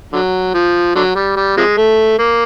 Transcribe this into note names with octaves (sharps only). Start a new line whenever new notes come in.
D3 F#3
F3
D3 F#3
G3
G3
C3 F3 G#3
A3
A#3